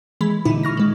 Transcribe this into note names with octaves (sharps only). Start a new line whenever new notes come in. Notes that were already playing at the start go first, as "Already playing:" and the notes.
E3 G#3 B5
A#2 D3 D#4 E4
C#6 F6 A#6
D#3 G#3